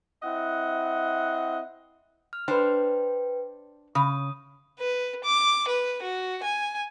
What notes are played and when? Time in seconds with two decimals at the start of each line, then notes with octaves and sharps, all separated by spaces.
0.23 C4 E4 D#5 F#5
2.33 F6
2.48 D4 B4 C5 G5
3.95 C#3 D#6
4.79 B4
5.24 D6
5.68 B4
6.02 F#4
6.43 G#5